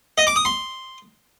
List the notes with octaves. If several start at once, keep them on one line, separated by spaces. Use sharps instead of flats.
D#5
D6
D#6
C6